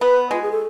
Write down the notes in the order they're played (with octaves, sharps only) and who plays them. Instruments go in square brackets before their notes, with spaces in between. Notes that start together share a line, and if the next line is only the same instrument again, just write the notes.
[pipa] B3 [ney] B4
[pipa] G#3 [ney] F4
[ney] G#4
A4